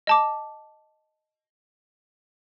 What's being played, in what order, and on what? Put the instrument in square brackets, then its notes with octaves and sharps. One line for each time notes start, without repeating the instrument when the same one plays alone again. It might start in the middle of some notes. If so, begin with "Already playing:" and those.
[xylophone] D#5 A5 D6